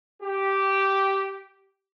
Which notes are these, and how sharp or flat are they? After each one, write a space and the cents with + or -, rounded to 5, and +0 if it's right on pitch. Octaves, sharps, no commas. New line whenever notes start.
G4 -10